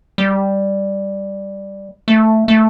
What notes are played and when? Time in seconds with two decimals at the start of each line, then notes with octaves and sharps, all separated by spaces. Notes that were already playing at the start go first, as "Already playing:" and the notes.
0.18 G3
2.08 A3
2.48 A3